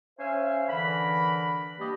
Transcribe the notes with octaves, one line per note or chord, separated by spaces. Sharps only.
C#4 C5 E5 F5 G#5
D3 E3 A#4 B5
G3 A#3 D4 G4 D5 D#5